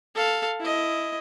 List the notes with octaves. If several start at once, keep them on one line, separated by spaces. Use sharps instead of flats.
A4 F5
E4 D#5